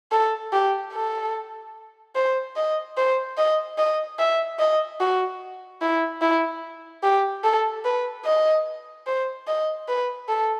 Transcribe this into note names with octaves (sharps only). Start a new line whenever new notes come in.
A4
G4
A4
C5
D#5
C5
D#5
D#5
E5
D#5
F#4
E4
E4
G4
A4
B4
D#5
C5
D#5
B4
A4